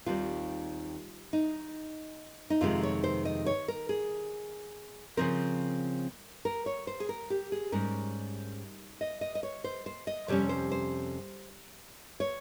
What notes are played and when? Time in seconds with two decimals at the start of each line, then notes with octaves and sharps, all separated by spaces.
0.06 D#2 D#3 G3 C4 F4
1.33 D#4
2.50 D#4
2.61 F2 C3 D#3 G#3 F4
2.83 C#5
3.04 C5
3.25 D#5
3.46 C#5
3.68 A#4
3.89 G#4
5.17 C#3 F3 C4 A#4
6.45 A#4
6.66 C#5
6.87 C5
7.00 G#4
7.09 A#4
7.30 G4
7.52 G#4
7.72 G#2 G3 C#4 A#4
9.01 D#5
9.21 D#5
9.35 D#5
9.43 C#5
9.64 C5
9.86 C5
10.07 D#5
10.28 F2 C3 G3 C#4 C#5
10.49 C5
10.72 C5
12.20 C#5